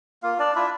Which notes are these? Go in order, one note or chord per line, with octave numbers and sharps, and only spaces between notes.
A#3 F4 F5
D4 D5
D4 E4 F4 E5